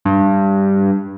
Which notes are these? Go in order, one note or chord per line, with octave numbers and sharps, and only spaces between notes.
G2